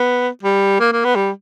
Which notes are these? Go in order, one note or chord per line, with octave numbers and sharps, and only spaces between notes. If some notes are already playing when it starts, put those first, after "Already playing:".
Already playing: B3
G3
A#3
A#3
B3
G3